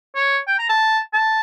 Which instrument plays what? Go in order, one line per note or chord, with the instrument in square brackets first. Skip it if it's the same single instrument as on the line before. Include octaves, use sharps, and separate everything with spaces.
[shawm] C#5
G5
A#5
A5
A5